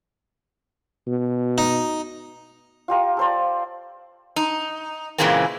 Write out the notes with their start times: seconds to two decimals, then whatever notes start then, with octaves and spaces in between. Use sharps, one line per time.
1.07 B2
1.58 D#4
2.88 F4 G4 A#4
3.17 A4 C5 D5
4.36 D#4
5.18 A#2 C#3 E3 G#3 A#3 C4